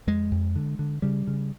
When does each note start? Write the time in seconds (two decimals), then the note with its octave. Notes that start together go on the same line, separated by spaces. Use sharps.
0.07 F2 G#3
0.31 F2
0.56 D3
0.79 D3
1.02 C#3 G3
1.27 C#3